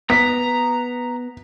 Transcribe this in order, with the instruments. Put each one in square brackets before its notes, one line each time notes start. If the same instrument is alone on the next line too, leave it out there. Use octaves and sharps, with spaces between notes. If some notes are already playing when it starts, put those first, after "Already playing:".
[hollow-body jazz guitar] B3 [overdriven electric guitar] A#5 [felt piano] B6